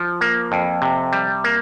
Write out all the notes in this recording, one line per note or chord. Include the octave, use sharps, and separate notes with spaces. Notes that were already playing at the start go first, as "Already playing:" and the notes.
Already playing: F3
A#3
F2
C3
G3
A#3